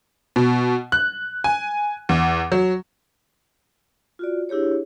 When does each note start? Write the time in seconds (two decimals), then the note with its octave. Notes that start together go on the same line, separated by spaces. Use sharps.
0.36 B2
0.92 F#6
1.44 G#5
2.09 E2
2.52 F#3
4.19 F4 F#4 D5
4.49 D4 E4 G4 G#4 C#5